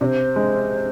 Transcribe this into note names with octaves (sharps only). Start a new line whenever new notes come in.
C3 C5 D5
G#3